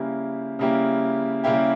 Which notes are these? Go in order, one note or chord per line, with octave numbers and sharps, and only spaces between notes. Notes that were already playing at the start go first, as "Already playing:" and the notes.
Already playing: C#3 G3 A#3 E4 G4
C#3 G3 A#3 E4 G4
C#3 G3 A#3 E4 G4